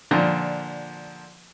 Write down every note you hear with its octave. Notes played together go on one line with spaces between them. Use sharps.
A#2 D3 F3